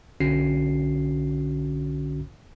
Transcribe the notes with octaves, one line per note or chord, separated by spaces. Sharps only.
B1 D3 C#4 F#4 C7